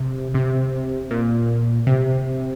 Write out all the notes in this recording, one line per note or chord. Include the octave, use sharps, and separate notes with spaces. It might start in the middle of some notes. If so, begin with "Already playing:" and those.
Already playing: C3
C3
A#2
C3